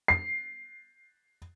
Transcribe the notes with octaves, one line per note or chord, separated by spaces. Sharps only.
C7